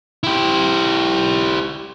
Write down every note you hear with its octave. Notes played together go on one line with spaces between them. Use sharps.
E4 G4